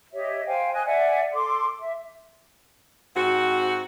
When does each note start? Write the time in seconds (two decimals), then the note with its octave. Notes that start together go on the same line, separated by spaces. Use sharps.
0.14 G4 C#5 D#5 E5
0.46 C5 F5 G5 G#5
0.73 D#5 G#5 F#6
0.85 D5 E5 F#5 G#5
1.33 A4 C6 D6
1.80 E5
3.16 G#2 C4 F#4